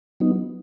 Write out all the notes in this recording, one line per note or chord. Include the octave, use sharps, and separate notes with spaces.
F#3 B3 D#4